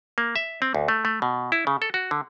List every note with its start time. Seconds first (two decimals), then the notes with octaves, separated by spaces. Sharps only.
0.18 A#3
0.36 E5
0.62 C4
0.75 D2
0.88 A3
1.05 A3
1.22 B2
1.52 E4
1.67 C#3
1.82 A4
1.94 F#4
2.11 D3